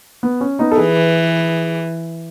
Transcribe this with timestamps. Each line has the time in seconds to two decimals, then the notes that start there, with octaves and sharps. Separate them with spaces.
0.23 B3
0.41 C#4
0.59 B3 D#4
0.72 A4
0.77 E3 G#4 B4